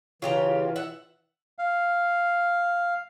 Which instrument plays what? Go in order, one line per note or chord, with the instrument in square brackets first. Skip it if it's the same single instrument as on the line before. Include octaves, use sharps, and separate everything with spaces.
[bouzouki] C#3 G4 A#5 [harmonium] E3 [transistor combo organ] F4
[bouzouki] E5 F#5
[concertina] F5